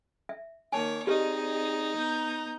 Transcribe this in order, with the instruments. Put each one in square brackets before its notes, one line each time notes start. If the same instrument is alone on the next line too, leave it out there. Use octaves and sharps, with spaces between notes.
[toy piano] E5
[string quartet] D#3 A#3 D6 [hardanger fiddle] C#5 [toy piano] G#5 A5
[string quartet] C4 G#4 D5 [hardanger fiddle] D#4 [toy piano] G4 B4 D#5
[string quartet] B3 A#5 G6